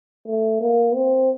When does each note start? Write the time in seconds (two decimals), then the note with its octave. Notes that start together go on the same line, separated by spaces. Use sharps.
0.27 A3
0.60 A#3
0.95 C4